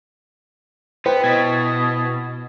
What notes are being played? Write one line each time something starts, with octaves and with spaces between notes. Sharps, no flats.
B3 E4 B4 C5 G5
B2 D#5 G#6 A6 B6